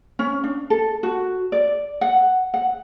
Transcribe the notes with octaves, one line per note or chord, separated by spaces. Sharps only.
C#4
D4
A4
F#4
D5
F#5
F#5